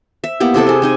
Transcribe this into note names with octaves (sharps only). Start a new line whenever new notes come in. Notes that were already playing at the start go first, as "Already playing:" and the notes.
E5
A#3 B3 E4 G4
C3 E4 A4 C5
G#4 D#5
C4 D#4 G#5